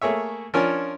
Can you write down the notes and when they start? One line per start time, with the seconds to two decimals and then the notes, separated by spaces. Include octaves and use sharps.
0.01 A3 A#3 G#4 C#5 E5
0.54 F3 C#4 D4 A#4 C#5 G#5